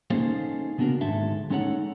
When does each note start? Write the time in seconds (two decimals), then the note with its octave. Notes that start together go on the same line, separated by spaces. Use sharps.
0.10 A#3 C#4 D#4 G#4 A4 C5
0.78 C#3 B3 D4 F#4 A#4
1.01 D2 G#2 D#3 G#3 A4 E5
1.50 G#3 C#4 D#4 A4 C#5 F#5